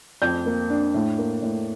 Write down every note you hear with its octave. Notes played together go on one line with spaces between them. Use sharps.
F2 G6
A#3
D4
A2
A#3
A2